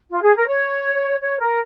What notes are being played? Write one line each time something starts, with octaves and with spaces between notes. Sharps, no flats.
F4
G#4
A#4
C#5
C#5
A#4